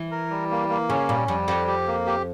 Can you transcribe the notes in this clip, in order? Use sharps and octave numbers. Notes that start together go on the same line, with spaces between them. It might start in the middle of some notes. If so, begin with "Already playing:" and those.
Already playing: E3
A#4
G3
A#3
A#3
C#3 C#4
A#2 G3
F2 G3
F2 G4
G4
A#3
G4